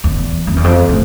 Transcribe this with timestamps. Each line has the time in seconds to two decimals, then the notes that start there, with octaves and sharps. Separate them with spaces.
0.04 E2
0.47 F2
0.56 E2
0.64 F2
0.89 A2